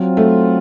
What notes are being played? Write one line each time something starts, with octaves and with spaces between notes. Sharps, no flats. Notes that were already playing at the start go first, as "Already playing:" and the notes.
Already playing: F#3 C4 F4
A3